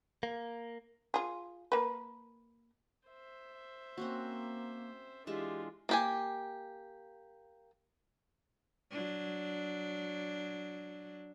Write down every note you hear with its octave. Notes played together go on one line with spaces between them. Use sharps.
A#3
F4 G#4
A#3 B4
C5 E5
A#3 C4 C#4 F#4
E3 G#3 D4 F4 G4 E5
A#3 G4 G#5
F#3 D4